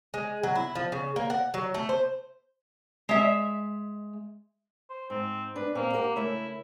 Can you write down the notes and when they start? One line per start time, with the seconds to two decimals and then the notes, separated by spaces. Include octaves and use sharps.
0.14 G#3
0.43 F#3
0.55 E4
0.75 F3
0.92 C#3
1.16 A#3
1.30 F#5
1.54 F#3
1.74 A3
1.89 C5
3.09 G#3 E5
4.90 C5
5.10 G#2 C4
5.56 D4 B4
5.75 A#2 A#3 C4
5.93 G4 A#4 F#5
6.16 C#3 A3 E4 A#4